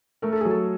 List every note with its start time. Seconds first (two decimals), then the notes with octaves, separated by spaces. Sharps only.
0.22 A3 A#4
0.32 A4
0.41 G#4
0.45 F#3
0.50 A4